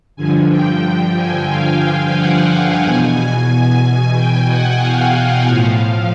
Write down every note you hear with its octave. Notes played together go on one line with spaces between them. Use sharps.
G2 D3 F3 G#5
G5
G#5
F5
F#5
G5
E2 B2 G#5
G5
F#5
F5
F5
A2 F3